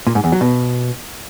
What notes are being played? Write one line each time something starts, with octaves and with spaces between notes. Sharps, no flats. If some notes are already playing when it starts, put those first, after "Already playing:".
A#2
G#2
E2
F#3
B2